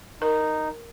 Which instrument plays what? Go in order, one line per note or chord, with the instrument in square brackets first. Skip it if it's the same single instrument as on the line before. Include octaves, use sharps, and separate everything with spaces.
[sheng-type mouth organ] D#4 [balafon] A#4